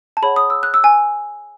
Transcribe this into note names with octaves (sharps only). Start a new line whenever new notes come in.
A5
G#4 C#5 F#5 B5
D#6
E6
F#6
E6
G#5